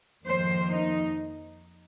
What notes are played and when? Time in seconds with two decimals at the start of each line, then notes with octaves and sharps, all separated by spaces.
0.25 F2 D#3 A#3 C5
0.69 D#4